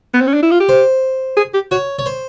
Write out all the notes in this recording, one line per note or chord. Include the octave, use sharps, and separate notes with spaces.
B3
C4
C#4
D4
E4
F4
G4
C5
G#4
G4
F#4 C#5
C#5
C5